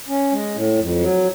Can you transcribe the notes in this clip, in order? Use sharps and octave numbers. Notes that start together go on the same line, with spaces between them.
C#4
G#3
A2
F2
F#3